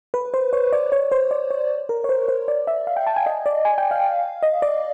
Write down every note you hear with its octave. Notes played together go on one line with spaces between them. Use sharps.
B4
C5
C#5
D5
C#5
C5
D5
C#5
A#4
C#5
C5
C5
D5
E5
F5
G5
A5
G#5
D#5
D5
G#5
G5
F5
D#5
D5